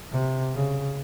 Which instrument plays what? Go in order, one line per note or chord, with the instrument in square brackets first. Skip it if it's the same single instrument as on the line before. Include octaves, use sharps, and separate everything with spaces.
[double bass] C3
C#3